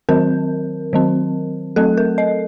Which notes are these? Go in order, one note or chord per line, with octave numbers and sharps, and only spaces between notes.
D#3 F#3 C4 A#4
D#3 F#3 C4
F#3 A3 C4 A4
A#4
D#5